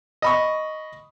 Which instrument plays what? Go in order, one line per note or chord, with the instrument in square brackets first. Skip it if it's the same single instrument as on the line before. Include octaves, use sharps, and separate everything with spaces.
[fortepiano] D#5 B5 C#6